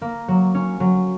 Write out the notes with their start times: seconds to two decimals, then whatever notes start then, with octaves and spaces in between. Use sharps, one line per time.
0.02 A#3
0.28 F#3
0.55 C#4
0.80 F#3